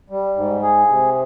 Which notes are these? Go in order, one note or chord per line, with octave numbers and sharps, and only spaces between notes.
G3
G#2
G#4
C3